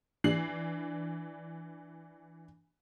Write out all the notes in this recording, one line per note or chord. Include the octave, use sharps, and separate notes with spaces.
E3 D4 C7 F#7